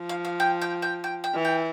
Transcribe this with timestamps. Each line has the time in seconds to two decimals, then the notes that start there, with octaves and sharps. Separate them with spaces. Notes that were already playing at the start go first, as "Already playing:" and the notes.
Already playing: F3
0.09 F5
0.25 F5
0.40 G5
0.62 G5
0.82 G5
1.04 G5
1.24 G5
1.34 E3
1.45 G5